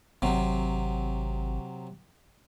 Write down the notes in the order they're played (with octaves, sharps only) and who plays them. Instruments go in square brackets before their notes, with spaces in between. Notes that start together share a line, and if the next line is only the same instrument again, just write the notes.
[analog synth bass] G#1 [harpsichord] C3 F#3